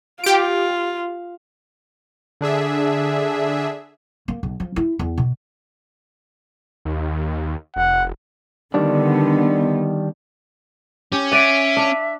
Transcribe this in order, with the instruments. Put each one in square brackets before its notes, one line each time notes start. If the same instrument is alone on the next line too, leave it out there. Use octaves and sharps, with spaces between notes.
[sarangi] F4 [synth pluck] G4 D7
[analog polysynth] D3 D4 G#4 E5
[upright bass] A#3
B1
F3
E4
E2
B2
[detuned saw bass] D#2
[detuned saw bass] F1 [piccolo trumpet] F#5
[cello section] D3 B3 [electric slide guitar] D#3 G3 D4
[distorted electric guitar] C#4 [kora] G4
[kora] D5 F#5 [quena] E5 [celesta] D7 D#7
[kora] D4 F5